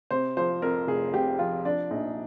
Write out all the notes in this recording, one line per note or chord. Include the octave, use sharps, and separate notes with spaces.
C3 C5
F3 C5
F2 A#4
F1 G#4
C3 G4
F3 F4
F3 D4
A#1 D#4